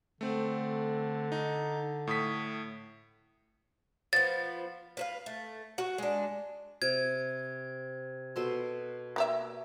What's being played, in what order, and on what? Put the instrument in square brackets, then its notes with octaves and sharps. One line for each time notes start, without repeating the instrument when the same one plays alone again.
[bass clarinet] D3 [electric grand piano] A3 C4
[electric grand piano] D#4
A2 D#6 B6
[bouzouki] F3 B3 [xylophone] A6
[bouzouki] B4 C5 F5
A3
F#4
G#3 D4
[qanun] C3 [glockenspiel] G#6
[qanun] B2 A4 C6
[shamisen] A#3 G4 E5